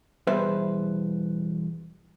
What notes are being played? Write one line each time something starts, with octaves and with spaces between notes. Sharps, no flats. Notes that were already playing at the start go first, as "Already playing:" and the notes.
E2 B2 G3 B4 C5 E5